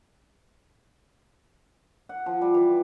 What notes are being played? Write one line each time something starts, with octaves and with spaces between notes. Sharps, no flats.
F#5
F3
G3
E3